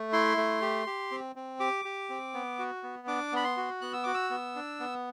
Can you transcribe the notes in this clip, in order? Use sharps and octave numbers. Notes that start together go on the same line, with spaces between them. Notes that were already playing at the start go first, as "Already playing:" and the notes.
Already playing: A3
E4 C6
A3
G4
G4
C4
C4
G4 D6
G4
C4
B3
F#4
B3
D4 D6
B3 B5
C6
F#4
B3 F#6
E6
F#4 D6
E6
B3
D4
B3